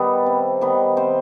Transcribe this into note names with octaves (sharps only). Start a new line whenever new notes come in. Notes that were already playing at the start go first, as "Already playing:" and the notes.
Already playing: D#3 G3 B3 G4 A4 B4
C3
D#3 G3 B3
C3 C5